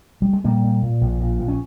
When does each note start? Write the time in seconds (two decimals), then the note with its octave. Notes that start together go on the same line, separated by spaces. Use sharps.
0.22 G3
0.33 G#3
0.44 A#2 G3 A#3
0.64 A#2
0.83 A#2
1.01 A#1
1.20 A#2
1.39 A#1
1.48 C#4